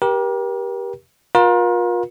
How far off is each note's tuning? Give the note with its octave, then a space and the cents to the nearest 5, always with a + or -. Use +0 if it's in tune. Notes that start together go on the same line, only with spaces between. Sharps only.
G4 +0 A#4 +40
F4 +35 A#4 +40